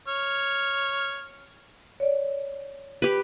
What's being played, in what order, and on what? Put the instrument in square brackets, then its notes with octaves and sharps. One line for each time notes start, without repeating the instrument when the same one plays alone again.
[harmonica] C#5 F6
[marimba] C#5 D5
[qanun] G4 B4